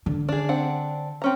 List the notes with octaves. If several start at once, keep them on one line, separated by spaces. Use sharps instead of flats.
D3
D4 G#4
C4 D4 F#5
C4 C#4 A#5